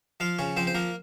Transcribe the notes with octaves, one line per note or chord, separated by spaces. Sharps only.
F3 F4 F5
C#3 C#4 C#5
F3 C4 C5
C5
F3 A#3 A#4